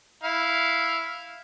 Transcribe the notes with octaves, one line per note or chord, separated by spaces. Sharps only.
E4 F5